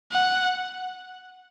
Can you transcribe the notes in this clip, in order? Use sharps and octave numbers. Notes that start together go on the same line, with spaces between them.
F#5